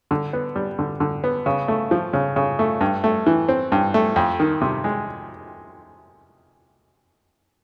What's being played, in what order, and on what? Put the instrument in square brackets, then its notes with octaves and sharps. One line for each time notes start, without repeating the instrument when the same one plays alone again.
[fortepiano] D3
B3
G3
D3
D3
B3
C#3
A3
F3
C#3
C#3
A3
G2
A3
E3
C4
G2
A3
F2
D#3
C3
G#3